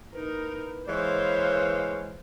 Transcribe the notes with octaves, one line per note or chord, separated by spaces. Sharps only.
A#3 D#4 E4 A#4 B4
E3 G#3 C5 C#5 F5